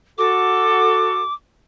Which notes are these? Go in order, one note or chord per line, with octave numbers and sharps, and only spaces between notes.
F#4 A4 D6